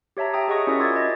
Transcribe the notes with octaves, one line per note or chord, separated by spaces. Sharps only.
G4 C#5 E5 A5 A#5
G4 C#5 E5 G5 A#5 D#6
G#4 D#5 F#5 C#6 D#6
C#4 E4 F#4 A#4 D5 E5
F4 C6 D6 E6 G#6 A6
D5 D#5